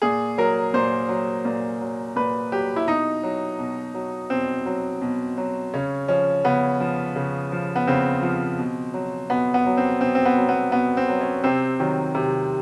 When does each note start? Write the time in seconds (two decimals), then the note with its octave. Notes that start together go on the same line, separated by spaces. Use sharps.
0.02 A#2 G#4
0.38 F#3 A#4
0.74 A#2 C5
1.09 F#3
1.45 A#2
1.81 F#3
2.16 A#2 B4
2.52 F#3 G4
2.76 E4
2.87 B2 D#4
3.23 F#3
3.59 B2
3.94 F#3
4.30 B2 C4
4.66 F#3
5.02 B2
5.38 F#3
5.74 C#3 C#4
6.08 F3 C#4
6.44 C#3 B3
6.80 F3
7.16 C#3
7.52 F3
7.76 B3
7.87 C#3 C4
8.22 F3
8.59 B2
8.94 F#3
9.30 B2 B3
9.54 B3
9.66 F#3
9.77 C4
10.01 B2 C4
10.15 C4
10.25 B3
10.38 F#3
10.49 B3
10.72 B2 B3
10.97 C4
11.09 F#3
11.21 C#4
11.44 C3 C4
11.80 D#3 F#3
12.15 C3